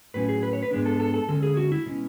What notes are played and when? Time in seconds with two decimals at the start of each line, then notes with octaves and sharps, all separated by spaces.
0.14 A2 F#3 C#4 B4
0.29 G#4
0.43 B4
0.53 C#5
0.62 B4
0.71 G#2 G#3 B3 D4
0.86 A4
1.00 A4
1.14 A4
1.28 D3 G#3 C#4 A4
1.43 G#4
1.57 F#4
1.72 E4
1.86 B2 G#3 C#4